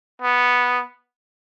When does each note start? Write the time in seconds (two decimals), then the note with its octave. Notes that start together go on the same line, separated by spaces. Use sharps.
0.22 B3